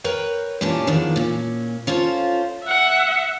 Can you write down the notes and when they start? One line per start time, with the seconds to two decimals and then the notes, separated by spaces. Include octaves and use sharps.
0.04 A#4 B4 C#5 G5
0.61 G2 A#2 E3 C#4 D4
0.87 E2 D#3 F3 D4
1.16 A#2 C#4
1.87 C#4 F4 A4 C5
2.64 E5 F#5